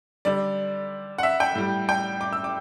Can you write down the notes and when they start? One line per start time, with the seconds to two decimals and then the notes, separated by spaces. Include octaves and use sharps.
0.25 D3 G3 D5
1.18 F#5
1.23 E5
1.40 G5
1.55 A2 G3
1.89 G5
2.21 D6
2.33 E6
2.44 D6